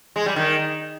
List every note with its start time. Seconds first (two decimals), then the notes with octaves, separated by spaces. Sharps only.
0.16 G#3
0.26 G3
0.36 D#3